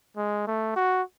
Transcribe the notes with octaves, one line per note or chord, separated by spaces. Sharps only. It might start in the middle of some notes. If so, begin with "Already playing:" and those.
G#3
A3
F#4